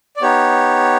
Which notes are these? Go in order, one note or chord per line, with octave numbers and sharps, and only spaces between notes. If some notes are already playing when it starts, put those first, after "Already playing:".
D5
B3 D#4 G4 C#5